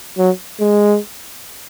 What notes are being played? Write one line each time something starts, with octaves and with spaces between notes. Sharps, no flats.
F#3
G#3